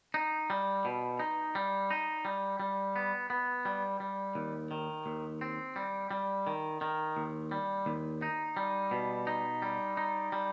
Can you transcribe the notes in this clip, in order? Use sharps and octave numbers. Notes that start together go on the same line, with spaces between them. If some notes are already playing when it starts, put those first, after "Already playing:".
D#4
G3
B2
D#4
G3
D#4
G3
G3
B3
B3
G3
G3
D#2
D#3
D#2
C4
G3
G3
D#3
D#3
D#2
G3
D#2
D#4
G3
B2
D#4
G3
D#4
G3